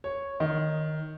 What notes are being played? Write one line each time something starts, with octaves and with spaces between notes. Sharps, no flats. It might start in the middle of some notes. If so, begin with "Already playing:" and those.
C#5
D#3